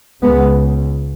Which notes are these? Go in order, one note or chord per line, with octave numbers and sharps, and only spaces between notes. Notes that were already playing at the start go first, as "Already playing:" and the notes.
C#2 C#3 G#3 B3